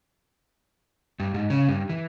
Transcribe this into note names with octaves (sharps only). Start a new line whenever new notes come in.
G2
G#2
C#3
G2
E3